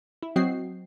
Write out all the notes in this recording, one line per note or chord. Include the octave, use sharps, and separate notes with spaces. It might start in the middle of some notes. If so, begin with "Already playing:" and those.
E4
F#3 C4 F#4 D#5 G5 C7